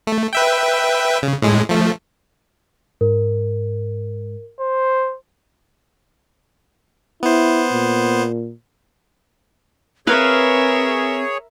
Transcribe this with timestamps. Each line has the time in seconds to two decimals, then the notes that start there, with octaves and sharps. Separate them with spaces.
0.07 A3
0.33 B4 E5 G5
1.23 C#3
1.42 A2 G#3
1.69 F3 A3
3.01 G#2 A#4
4.60 C5
7.23 B3 E4 C5
7.72 A#2
10.07 C4 G#4 A#4 B4 C#5 E5 F5